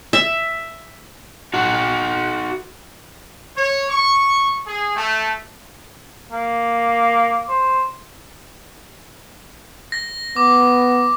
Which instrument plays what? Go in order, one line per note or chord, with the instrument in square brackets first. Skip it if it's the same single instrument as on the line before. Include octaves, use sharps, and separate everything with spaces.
[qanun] E5
[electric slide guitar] D#4 F#4
[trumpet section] C#5
C#6
G#4
A3
[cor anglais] A#3
C5
[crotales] A#6
[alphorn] B3 [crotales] D6